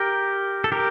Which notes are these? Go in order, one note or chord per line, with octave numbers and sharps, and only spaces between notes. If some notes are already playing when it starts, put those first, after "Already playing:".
Already playing: G4 A#4
A4
G4 A#4